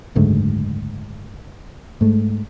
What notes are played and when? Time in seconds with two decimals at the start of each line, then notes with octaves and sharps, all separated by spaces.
0.16 F#1 D2 G#2 A3
2.01 G#2 A3